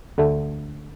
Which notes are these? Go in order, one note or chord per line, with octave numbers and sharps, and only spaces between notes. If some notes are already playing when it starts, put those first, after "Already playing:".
D2 D3 A3